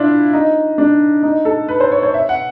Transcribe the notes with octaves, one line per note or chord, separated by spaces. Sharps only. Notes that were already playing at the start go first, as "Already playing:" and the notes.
Already playing: D4 E4 F4
D#4
D4
D#4
A4
B4
C5
C#5
C#5
E5
F#5